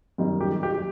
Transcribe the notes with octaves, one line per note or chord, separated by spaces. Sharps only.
F#2 D#3 G3
G4
G4